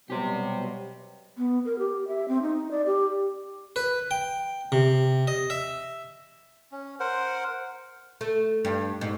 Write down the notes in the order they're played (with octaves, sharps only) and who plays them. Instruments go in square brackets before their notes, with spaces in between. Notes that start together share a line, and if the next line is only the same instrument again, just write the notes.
[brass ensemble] B2 F#3 G3 [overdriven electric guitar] G4 C5
[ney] B3
A#4
G4
E5
C4
D#4
D5
G4
[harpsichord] B4
G5
C3
D#5
E5
[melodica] C#4
A#4 C5 F#5
[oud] A3
G2
G#2